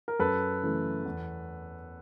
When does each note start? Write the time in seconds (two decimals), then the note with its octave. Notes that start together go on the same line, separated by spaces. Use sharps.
0.08 A#4
0.19 F#2 A4 B4
0.62 C#3 E3 A3
1.05 E2